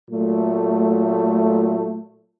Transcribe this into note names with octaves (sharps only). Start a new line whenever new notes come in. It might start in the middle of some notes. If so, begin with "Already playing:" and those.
A#2 F#3 A3